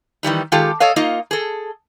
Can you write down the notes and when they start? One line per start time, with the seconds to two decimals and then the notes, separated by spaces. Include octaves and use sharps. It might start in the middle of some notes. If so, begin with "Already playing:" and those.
0.23 D#3 E3 G3 D#4
0.52 D#3 G#3 F4 G4 A4
0.80 A4 C#5 D#5 F5
0.96 A#3 D#4 F4 D#5
1.31 G#4 A4